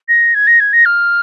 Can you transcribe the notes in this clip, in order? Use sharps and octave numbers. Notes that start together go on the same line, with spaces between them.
A#6
G#6
A#6
G#6
A#6
F6